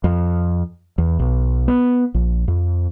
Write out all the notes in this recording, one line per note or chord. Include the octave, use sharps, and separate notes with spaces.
F2
E2
B1
B3
A#1
F2